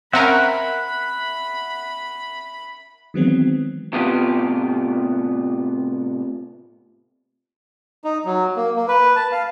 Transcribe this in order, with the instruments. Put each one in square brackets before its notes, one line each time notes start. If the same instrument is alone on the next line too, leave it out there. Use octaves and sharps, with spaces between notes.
[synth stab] C4 C#4 A#4 [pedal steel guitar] E5 F#5 [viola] B5
[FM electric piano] D#3 E3 F#3 G#3 B3 C4
[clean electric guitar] A2 C3 B3 F4 G4
[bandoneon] D#4
F#3
A#3
A#3
B4
A5
F5